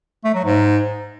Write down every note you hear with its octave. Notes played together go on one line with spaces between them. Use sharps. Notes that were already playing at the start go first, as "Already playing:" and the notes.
A3
F#3
G#2